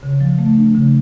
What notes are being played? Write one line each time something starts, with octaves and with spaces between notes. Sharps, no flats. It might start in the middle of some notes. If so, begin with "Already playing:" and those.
C#3
F3
A3
D4
C#3